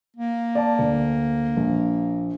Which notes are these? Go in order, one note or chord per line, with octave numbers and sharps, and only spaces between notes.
A#3
D5 A5
D2
A#1